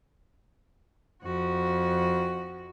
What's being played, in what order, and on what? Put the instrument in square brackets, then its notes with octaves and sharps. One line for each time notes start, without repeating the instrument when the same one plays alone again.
[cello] F2 F#4